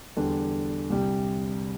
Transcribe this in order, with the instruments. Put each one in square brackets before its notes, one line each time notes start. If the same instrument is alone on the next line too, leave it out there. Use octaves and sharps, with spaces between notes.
[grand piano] E2 D3 G3 D4
C2 C3 G3